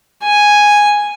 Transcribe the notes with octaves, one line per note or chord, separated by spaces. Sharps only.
G#5